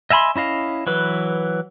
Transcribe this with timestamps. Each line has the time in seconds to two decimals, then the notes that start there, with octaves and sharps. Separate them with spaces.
0.10 D#5 E5 G#5 B5 C6
0.36 C#4 E4 D#5 F5
0.87 E3 F#3 B4